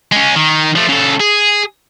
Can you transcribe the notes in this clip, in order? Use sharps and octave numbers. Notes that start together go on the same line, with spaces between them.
G#3 C#4
D#3
F3 A3
C#3 A4
G#4